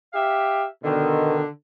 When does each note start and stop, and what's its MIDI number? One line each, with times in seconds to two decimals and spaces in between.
0.13 0.64 67
0.13 0.64 76
0.13 0.64 77
0.83 1.40 47
0.83 1.47 50
0.83 1.40 51